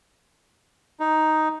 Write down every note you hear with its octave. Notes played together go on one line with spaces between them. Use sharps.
D#4